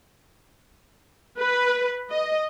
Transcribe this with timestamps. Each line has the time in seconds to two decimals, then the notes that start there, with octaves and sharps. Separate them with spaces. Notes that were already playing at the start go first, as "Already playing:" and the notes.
1.38 B4
2.10 D#5